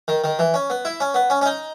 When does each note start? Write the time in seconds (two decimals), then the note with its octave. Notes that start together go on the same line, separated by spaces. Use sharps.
0.08 D#3
0.24 D#3
0.39 E3
0.54 C#4
0.70 B3
0.85 E4
1.00 C#4
1.14 B3
1.30 C#4
1.41 C#4
1.46 D#4